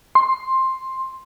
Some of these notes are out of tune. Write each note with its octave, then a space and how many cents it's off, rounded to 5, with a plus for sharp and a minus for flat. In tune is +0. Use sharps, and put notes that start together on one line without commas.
C6 +10